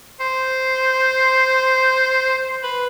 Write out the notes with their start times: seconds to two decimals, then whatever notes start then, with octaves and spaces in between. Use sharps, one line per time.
0.20 C5
2.63 B4